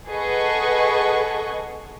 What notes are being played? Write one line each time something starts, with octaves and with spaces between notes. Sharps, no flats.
G#4 A4 B4 D#5 F#5 C#6